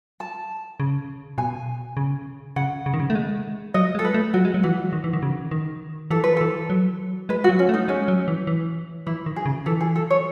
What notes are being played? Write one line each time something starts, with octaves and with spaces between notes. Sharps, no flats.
A5
C#3
B2 G#5
C#3
C#3 F#5
C#3
D#3
C#3
A3
G#3
F#3 D#5
G#3
A4
B4
A3
F#3 F#4
G#3
F#3
E3 F#4
D#3
E3
D#3
C#3
D#3
E3 A4
B4
E3 A4
F#3
G#3 B4
F#4
F#3
C#4
A3
D#4
G#3 C#4
F#3
E3
E3
E3 E4
D#3
G#4
C#3
E3 A4
G#4
A4
C#5